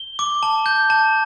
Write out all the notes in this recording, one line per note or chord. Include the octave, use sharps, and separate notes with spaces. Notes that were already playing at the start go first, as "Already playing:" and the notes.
Already playing: G7
D6
A5
G6
A5